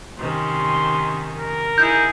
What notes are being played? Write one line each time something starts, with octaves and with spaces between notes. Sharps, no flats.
C3 D#3 C#4 C6
A#4
D#4 E4 G#4 G6